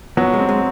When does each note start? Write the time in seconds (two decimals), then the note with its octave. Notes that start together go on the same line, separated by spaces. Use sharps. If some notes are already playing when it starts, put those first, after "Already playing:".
0.17 F#3 B3
0.34 G#3
0.39 C4
0.49 G#3